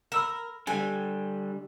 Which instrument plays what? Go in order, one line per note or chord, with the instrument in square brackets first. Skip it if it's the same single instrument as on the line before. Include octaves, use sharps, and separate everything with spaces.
[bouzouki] A#4 [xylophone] B5 E6 E7
[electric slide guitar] D3 G3 [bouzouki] G#5